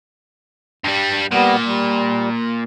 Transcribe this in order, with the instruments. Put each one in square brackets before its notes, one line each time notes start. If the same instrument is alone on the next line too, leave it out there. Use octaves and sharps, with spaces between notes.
[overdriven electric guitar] G2 G3
[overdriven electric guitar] A#2 [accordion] G3 B3
[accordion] G3